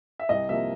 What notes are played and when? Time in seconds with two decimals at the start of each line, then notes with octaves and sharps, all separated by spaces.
0.19 E5
0.29 C2 D#5
0.49 C3 F3 A#3 E5